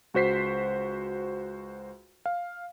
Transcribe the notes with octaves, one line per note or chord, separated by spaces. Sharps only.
C#2 F#4 C5 B6 C7
F5